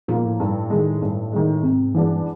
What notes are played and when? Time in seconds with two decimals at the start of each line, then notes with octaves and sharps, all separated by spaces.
0.08 A#2 F3 A#3
0.25 A2
0.40 G2
0.70 D#3 G#3
1.02 G2
1.32 D#3 G#3
1.63 G#2 C3
1.94 G2 E3 G#3 B3 D4